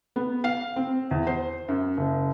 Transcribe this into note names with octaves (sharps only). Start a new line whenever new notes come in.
B3
F5
C4
E2
C5
F#2
F#1